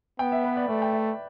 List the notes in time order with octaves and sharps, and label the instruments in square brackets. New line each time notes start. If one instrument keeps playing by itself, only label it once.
[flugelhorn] B3 [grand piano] G5
[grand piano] E5
B4
D5
[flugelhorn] A3 [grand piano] D5
[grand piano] G5
E5